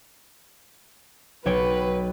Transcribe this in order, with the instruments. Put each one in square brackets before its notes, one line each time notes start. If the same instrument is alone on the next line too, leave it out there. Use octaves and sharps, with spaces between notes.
[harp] B1 C#5 G5 [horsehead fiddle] B4